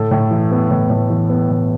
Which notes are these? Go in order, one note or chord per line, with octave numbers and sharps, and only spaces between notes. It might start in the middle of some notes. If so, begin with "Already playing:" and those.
Already playing: A2 A4
A2
E3
B3
A2
A2
E3
B3
A2